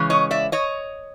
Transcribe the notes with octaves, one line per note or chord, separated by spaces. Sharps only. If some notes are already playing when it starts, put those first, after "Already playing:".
Already playing: C#3 E3 G#3 C#4
C#5 D#5
D5 E5
C#5 D#5